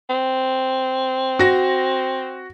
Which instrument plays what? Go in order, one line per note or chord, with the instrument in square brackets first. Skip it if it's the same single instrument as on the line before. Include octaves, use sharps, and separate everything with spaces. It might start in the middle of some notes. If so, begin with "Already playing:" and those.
[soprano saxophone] C4
[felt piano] F#4 A#6